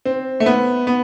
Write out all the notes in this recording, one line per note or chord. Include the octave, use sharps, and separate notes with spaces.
C4
A3
B3
B3